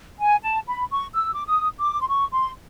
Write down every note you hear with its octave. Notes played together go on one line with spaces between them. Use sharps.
G#5
A5
B5
C#6
E6
D6
D#6
D6
C6
C#6
C6